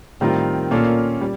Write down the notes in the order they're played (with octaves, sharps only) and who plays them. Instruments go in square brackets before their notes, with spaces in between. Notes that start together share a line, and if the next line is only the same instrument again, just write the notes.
[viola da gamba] A2 [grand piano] D#3 G3 C4 F4 A#4
[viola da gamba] A#2 [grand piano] A#3 C#4 F4 A4 D5
[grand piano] G3